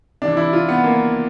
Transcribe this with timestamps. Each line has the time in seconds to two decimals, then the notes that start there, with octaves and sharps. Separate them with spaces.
0.22 C3 E3 D4
0.37 E4
0.53 F4
0.68 B3
0.84 A#3